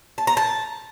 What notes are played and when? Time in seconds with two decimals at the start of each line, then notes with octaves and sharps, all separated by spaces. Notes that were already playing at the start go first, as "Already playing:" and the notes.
0.18 A5
0.27 A#5
0.37 A5